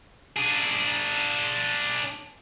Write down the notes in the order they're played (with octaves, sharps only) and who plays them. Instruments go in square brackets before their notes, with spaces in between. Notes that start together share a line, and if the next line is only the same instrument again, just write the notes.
[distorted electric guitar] D4 G#4